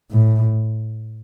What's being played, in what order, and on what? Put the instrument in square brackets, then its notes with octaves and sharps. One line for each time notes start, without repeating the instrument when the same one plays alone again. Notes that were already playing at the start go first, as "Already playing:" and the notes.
[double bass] A2